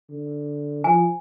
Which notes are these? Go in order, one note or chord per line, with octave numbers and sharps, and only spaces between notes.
D3
F3 G#5